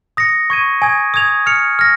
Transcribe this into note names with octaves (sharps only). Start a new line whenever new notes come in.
D#6 A#6 C#7
C#6 G#6 D#7
G#5 D#6 G#6
D#6 G#6 F7
F6 C#7 F7
F6 A#6